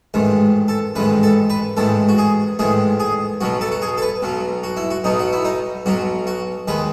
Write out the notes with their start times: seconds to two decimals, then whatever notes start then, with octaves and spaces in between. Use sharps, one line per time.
0.14 A1 G#2 D#3
0.68 A4
0.95 A1 G#2 D#3 B4
1.23 A4
1.50 B4
1.77 A1 G#2 D#3 A4
2.09 F#4
2.18 G#4
2.59 A1 G#2 D#3 G#4
3.00 G#4
3.41 B1 B2 F#3 F#4
3.61 A4
3.72 F#4
3.82 G#4
3.98 A4
4.02 B4
4.22 B1 B2 F#3
4.64 F#4
4.77 E4
4.91 F#4
5.04 B1 B2 F#3 D#4
5.19 F#4
5.33 E4
5.45 D#4
5.86 B1 B2 F#3 F#4
6.27 F#4
6.68 D#2 D#3 G#3 B4